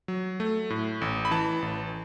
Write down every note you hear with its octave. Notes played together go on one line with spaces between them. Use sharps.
F#3
A3
A2
A1
B5
E3 A5
A1